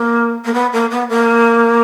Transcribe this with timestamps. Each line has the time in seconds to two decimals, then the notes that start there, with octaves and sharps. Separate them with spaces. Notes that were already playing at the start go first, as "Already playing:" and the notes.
Already playing: A#3
0.45 A#3
0.54 B3
0.73 A#3
0.91 B3
1.09 A#3